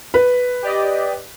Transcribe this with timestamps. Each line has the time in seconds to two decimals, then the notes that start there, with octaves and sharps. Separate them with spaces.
0.14 B4
0.62 G4 D5 D#5